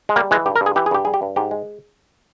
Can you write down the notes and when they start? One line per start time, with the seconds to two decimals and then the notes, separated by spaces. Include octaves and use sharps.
0.09 G#3
0.16 G3 A#3
0.31 E3 G#3
0.46 G2 G4
0.56 A#4
0.61 G2
0.66 G#4
0.76 E3 G4
0.86 G#4
0.91 G2 G4
1.05 G3 G#4
1.14 G4
1.22 G2
1.36 G#2 G4
1.51 G#3